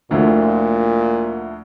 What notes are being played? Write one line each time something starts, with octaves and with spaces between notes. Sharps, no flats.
D2 A#2 D3 F3 A3 E4